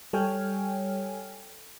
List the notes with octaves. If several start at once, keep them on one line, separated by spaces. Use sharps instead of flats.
G3 A4 C#5 G5 G#5 F6